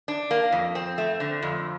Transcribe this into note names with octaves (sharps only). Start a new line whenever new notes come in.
D4
A#3
F2
C4
A3
D3
F2